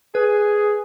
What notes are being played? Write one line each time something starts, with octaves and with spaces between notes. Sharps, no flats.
G#4 B4